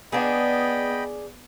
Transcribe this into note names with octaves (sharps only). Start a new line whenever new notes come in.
B3 D4 G#4 D#5 G5 B5